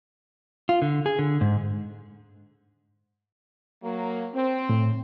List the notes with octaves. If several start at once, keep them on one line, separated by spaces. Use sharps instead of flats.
F4
D3
G#4
D3
G#2
F#3 A#3
C4
A2